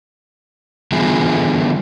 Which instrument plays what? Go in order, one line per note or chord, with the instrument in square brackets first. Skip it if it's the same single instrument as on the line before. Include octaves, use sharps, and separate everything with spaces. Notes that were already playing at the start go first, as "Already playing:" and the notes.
[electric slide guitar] D3 E3 G3 B3 F4 G#4